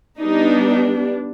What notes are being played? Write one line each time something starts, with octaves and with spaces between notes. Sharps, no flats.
G3 B3 D4 D#4